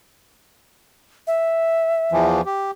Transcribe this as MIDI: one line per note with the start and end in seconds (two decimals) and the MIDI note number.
1.27 2.27 76
2.12 2.41 40
2.12 2.41 52
2.12 2.41 53
2.46 2.71 67